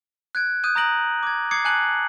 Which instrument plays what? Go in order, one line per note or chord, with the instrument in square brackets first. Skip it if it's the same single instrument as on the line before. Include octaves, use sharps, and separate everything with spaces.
[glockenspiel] F#6 G#6 D7
D#6 F#6 G6 D#7
A#5 D#6 F#6 A#6 D7 F#7
D6 G#6
D6 D#6 G#6 C7 C#7
G#5 A5 F#6 C#7 F#7